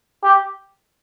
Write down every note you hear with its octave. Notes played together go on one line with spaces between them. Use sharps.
G4